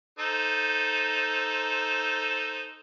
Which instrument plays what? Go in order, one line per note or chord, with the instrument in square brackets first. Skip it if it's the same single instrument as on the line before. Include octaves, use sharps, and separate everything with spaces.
[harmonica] D#4 A4 C5